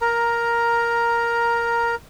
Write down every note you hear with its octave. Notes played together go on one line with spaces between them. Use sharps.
A#4 A#5